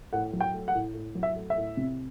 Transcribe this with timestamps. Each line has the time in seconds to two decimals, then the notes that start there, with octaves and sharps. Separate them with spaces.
0.13 A2 F#5
0.33 F#3
0.41 G5
0.54 A3
0.68 F#5
0.74 A2
0.94 A2
1.15 F#3
1.23 E5
1.36 A3
1.50 E5
1.57 A2
1.77 C3